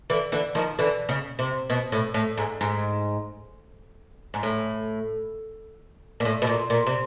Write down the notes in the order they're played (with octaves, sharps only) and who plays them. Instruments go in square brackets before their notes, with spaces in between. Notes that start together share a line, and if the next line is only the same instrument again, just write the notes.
[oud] D3 E3
D3 E3
D#3 F3
D3 E3
C#3
C3
B2
A2
A2
G#2
G#2
G#2
A2
A#2
A2
B2
A#2
A#2
C3